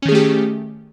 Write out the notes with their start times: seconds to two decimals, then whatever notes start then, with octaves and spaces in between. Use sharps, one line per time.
0.02 C#4
0.05 D#3
0.09 G#4
0.12 A3
0.15 G4